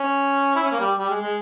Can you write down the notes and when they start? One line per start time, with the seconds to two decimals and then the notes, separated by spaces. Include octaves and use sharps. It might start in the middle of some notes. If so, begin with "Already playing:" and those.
Already playing: C#4
0.55 E4
0.63 C#4
0.72 A#3
0.80 G3
0.99 G3
1.10 G#3
1.21 G#3